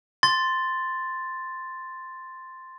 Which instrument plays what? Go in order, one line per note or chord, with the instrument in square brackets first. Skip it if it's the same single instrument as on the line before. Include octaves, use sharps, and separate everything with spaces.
[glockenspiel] C6 A6